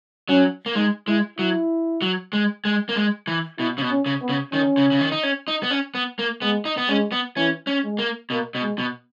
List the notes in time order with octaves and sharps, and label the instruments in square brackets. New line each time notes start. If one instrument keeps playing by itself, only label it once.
[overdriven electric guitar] F#3 [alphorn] C#4
[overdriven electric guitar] A#3
[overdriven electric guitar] G#3 [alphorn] D#4
[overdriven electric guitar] G#3 [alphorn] E4
[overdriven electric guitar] F#3 [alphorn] E4
[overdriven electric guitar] F#3
G#3
G#3
A#3
G#3
E3
[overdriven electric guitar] B2 [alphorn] E4
[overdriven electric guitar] C#3
B2
[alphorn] C#4
[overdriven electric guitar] C#3
[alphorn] B3
[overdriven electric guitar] C#3
[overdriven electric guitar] D#3 [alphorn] C#4
[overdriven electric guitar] C#3
C#3
D#3
D#4
C#4
D#4
B3
C#4
B3
A#3
[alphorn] G#3 [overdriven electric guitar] B3
[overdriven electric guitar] D#4
B3
[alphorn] G#3 [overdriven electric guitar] C#4
[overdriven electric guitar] B3
[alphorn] E3 [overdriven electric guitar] C#4
[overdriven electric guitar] C#4
[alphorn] G#3
[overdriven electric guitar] A#3
[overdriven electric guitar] B2 [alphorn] A#3
[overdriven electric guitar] B2
[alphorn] G#3
[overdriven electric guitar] B2